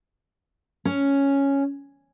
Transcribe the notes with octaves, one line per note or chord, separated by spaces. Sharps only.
C#4